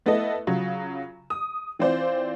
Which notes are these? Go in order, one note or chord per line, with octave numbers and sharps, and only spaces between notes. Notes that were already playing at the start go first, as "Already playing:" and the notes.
A3 B3 E4 A4 D#5
C#3 F#3 F4
D#6
E3 C4 F4 C5 D5